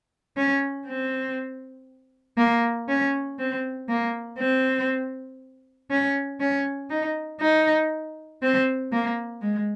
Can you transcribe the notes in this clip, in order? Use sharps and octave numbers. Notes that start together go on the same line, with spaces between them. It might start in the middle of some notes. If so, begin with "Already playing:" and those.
C#4
C4
A#3
C#4
C4
A#3
C4
C#4
C#4
D#4
D#4
C4
A#3
G#3